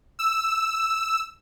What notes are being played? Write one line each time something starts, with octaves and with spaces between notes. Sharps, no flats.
E6